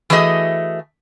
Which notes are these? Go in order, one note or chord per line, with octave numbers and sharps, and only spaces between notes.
E3 A3 F#4 G#4 D#5